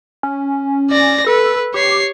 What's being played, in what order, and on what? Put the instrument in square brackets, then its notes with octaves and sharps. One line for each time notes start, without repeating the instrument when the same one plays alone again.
[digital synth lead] C#4
[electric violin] D5 A#6
[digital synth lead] A4 [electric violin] B4
[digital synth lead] G4 [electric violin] C#5 C7